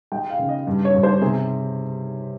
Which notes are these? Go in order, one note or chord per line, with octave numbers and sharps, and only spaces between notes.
G#3 G5
F5
C#3
D#5
G2
C#5
G2
C5
C3 G#4